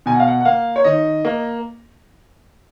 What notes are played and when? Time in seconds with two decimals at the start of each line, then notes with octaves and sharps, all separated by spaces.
0.06 B2 G#5
0.14 F#5
0.20 F5
0.27 F#5
0.40 F#5
0.45 A#3 F5
0.76 C#5
0.84 D#3 D#5
1.25 A#3